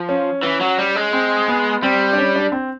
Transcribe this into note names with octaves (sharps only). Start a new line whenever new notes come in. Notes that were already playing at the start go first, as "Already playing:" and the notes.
Already playing: F3
C#4
E3 C#4
F#3
G3
G#3
C4
B3
G3 C4
D4
C#4
D4
C4